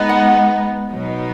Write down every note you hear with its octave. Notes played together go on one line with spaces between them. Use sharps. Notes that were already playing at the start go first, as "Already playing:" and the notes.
Already playing: G#3 B3 D#4
F#5
B2 F#3 B3 D#4